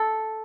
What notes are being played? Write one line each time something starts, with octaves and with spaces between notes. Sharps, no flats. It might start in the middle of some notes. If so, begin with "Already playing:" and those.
Already playing: A4